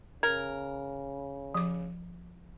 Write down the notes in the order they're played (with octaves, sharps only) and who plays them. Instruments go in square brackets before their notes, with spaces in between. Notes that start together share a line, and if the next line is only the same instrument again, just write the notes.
[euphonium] C#3 [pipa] A#4 [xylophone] G#6
[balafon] F3 D6